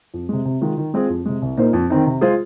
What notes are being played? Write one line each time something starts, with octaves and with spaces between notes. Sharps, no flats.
F2
C3 G#3
C3
D#3 G#3 F4
D#3
G#3 C4 F4 G#4
F2
C3 G#3
C2
A#2 A#3 D#4 C5
F2
D#3 C4 D#4
C3
G#3 F4 G#4 C5